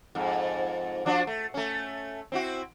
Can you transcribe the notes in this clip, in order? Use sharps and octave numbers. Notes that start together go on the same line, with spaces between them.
F2 G#2
F3 D4 F#4
A3
A3 C#4
C4 E4 F#4